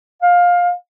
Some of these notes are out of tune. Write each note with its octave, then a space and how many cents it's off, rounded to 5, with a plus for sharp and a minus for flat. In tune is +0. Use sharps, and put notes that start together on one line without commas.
F5 +20